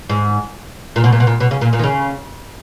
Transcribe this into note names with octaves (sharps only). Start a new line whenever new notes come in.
G#2
A#2
B2
A#2
B2
A#2
B2
C#3
A#2
A#2
D#3
C#3